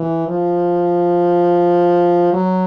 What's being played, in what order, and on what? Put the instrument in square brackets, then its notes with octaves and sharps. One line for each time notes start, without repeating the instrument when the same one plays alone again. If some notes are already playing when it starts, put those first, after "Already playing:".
Already playing: [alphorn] E3
F3
F#3